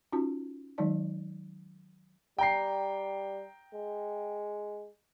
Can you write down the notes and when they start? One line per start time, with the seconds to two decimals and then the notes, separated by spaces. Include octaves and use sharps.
0.13 C#4 D#4 F4 F#4 A5
0.78 D#3 F#3 G#3 D#4 D5 A5
2.38 G3 G5 A#5 C7
3.73 G#3